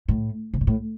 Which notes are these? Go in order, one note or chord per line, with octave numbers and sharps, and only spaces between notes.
A2
C3
A#2
A2